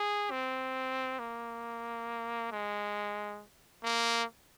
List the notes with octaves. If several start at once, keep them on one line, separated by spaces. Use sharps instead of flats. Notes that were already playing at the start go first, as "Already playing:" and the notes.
Already playing: G#4
C4
A#3
G#3
A#3